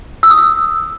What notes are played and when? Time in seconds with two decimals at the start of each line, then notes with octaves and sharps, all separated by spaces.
0.23 E6
0.30 D#6
0.38 E6